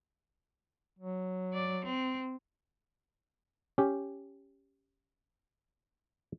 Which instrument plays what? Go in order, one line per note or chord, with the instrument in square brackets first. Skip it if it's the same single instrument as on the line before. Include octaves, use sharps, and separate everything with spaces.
[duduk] F#3
[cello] D5
C4
[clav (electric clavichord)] C#4 G4